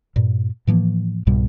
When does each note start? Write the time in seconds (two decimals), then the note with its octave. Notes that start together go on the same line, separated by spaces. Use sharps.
0.16 G2 A#2
0.67 A2 E3 F3 A#3
1.27 C2 G#2 B2 G3